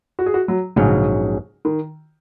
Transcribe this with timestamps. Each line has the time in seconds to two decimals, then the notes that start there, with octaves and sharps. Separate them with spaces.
0.19 F#4
0.26 G#4
0.34 F#4
0.48 F#3
0.76 A#1 G#2 C#3 F#3 C#4
1.65 D#3